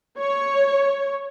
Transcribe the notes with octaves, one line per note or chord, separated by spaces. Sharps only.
C#5